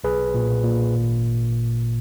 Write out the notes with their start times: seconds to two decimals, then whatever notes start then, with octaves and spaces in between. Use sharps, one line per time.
0.04 B1 G#4 B4
0.34 A#2
0.64 A#2
0.95 G#1